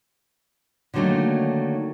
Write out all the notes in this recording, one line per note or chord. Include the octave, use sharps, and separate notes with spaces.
D3 D#3 F#3 A3 A#3 D#4